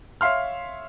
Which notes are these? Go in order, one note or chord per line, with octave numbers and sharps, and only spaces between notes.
C#5 E5 F5 C6 F6